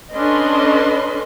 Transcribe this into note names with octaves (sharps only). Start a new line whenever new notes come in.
C#4 D4 A4 B4 D#5 C6